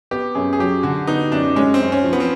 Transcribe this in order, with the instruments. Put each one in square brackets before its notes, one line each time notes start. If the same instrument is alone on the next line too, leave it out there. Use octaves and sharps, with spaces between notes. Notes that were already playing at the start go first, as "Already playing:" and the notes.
[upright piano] B3 [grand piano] G4
[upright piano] F#2 [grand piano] G#4
[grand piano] G#4
[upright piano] F#3 [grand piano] G4
[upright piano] D3 [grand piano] F#4
[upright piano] B3 [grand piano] D#4
[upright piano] F#2 [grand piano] D4
[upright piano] G#3 [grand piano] C#4
[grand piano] C4
[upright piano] F#2
[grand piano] C#4
[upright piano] F3
[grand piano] B3
C4